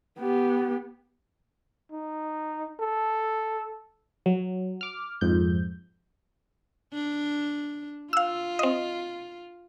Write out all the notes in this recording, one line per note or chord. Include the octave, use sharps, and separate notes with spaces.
B3 G4
D#4
A4
F#3
D6 F6
F2 G#2 G6
D4
F4 F5 E6
C4 D#5